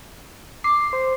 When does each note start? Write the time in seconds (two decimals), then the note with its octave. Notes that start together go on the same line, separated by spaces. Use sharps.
0.64 D6 C7
0.93 C5